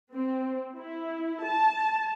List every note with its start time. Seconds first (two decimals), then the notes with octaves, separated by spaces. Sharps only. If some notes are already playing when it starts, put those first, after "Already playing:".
0.13 C4
0.77 E4
1.46 A5